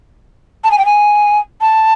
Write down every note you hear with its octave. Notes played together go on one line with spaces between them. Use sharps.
A5
G#5
G5
G#5
A5